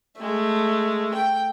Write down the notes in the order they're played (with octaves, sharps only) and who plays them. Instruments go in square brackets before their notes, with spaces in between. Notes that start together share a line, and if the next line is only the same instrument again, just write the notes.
[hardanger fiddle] G#3 [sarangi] A3
[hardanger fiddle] G5